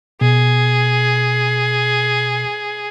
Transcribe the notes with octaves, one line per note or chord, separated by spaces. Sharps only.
B2 G#4